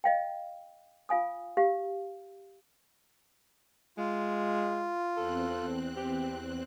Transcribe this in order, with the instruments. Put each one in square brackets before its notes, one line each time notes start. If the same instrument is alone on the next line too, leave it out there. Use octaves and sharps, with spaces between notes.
[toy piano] D#5 F5 G5
F4 F5 G#5 D#6
G4 F5
[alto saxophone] G#3 [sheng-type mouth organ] F4
[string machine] E2 C4 F#6 [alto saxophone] A4
[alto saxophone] G4